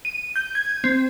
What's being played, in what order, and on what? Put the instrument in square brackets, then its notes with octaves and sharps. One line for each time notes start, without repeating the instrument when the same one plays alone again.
[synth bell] D#7
G6
G#6
C4